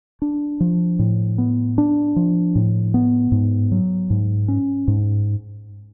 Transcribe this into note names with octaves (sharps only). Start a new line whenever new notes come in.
D4
F3
A2
B3
D4
F3
A2
B3
G#2
F#3
G#2
C#4
G#2